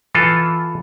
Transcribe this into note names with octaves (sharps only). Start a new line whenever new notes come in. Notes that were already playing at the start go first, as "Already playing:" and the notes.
E3 F4 A4